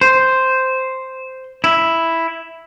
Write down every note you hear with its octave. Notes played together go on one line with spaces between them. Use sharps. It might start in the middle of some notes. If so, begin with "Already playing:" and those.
C5
E4